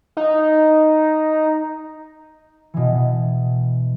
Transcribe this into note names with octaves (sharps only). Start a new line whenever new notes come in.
D#4
B2 E3